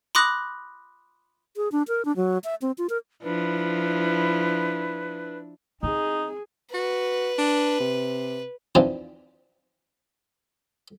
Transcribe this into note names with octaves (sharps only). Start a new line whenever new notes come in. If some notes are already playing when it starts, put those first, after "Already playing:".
B5 C6 D6 D#6 F#6 A#6
G#4
D4
A#4
D4
F#3
E5
C4
F4
A#4
F3 D4 E4 B4
C4 D#4 G#4
F#4 B4
D4
C3
E3 F3 C4 D4 D#4